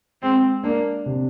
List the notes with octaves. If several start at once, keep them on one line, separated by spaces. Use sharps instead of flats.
G#3 C4
A#3 D4
C3